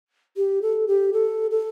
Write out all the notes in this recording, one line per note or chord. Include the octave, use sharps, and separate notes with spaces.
G4
A4
G4
A4
A4